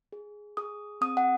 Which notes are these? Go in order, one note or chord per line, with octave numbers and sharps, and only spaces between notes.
G#4
G#4 D#6
C4 D#6
F#5